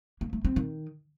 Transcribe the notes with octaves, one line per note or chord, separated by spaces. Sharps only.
A#3
A3
C4
D#3